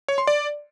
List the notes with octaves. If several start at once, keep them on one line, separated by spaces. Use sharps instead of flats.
C#5
C6
D5